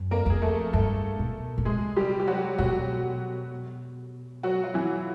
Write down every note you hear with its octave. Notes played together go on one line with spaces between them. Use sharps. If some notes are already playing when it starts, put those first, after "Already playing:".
Already playing: F#2
A#3 A#4
F2 G#4
A3 A4
G2 A3 A4
B2
B2
C3 G#3 G#4
G3 G4
G4
F#3 F#4
B2 F#3 F#4
F#3 F#4
F4
E3 E4